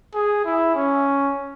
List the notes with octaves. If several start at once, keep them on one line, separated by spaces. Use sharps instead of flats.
G#4
E4
C#4